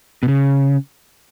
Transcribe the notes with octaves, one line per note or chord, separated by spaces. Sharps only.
B2
C#3